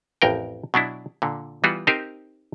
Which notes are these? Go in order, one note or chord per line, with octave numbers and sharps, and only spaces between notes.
A1 F2 A#4 G5
B2 F#3 D4 E4
A#2 D3
E3 G3 B3 F4 F#4
C4 D#4 G4 A#4 C5